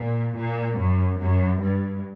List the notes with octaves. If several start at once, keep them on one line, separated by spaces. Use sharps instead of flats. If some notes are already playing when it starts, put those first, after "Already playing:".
Already playing: A#2
A#2
F#2
F#2
G2